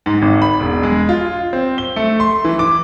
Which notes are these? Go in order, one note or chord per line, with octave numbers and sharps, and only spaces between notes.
G#2
G#1
B5
E1
G#3
F4
C4
G7
A3
C6
E3
D6